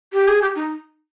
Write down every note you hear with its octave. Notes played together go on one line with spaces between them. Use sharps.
G4
G#4
G4
D#4